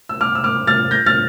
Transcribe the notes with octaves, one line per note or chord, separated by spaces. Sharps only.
E6
D6 F6
E6
D6 F6
F6 A6
G6 A#6
F6 A6